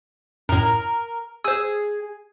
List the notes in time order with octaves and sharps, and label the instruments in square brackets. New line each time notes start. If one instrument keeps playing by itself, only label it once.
[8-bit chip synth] F#2 A2 [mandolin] A#4
[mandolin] G#4 [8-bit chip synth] C5 E6